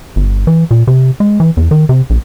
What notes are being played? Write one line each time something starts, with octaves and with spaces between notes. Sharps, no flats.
G1
E3
A#2
C3
G#3
E3
E2
D#3
C3
A#1